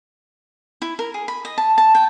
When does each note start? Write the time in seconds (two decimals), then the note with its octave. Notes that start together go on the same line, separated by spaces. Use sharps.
0.82 E4
0.99 A#4
1.14 G#4
1.28 B5
1.45 D#5
1.58 A5
1.78 A5
1.95 G5